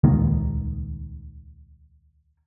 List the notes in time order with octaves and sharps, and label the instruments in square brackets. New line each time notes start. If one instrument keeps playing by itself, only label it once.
[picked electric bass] D#1 C#2 D#3 A#3